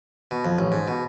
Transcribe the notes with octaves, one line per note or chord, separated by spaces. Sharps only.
B2
F2
A1
G#2
B2